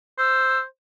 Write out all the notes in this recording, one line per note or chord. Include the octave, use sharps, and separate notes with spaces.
C5 E6